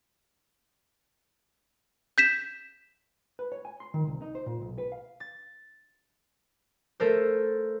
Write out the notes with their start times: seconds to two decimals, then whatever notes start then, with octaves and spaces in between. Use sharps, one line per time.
2.18 G6 B6 E7
3.39 B4
3.52 C#5
3.65 G#5
3.80 C6
3.94 D#3
4.07 C2
4.22 D#4
4.35 C5
4.46 A#2
4.62 B1
4.78 B4
4.92 F5
5.20 A6
7.00 A3 A4 A#4 C5